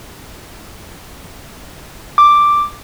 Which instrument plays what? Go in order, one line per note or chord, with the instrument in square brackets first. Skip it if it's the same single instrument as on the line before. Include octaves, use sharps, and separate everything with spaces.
[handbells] D6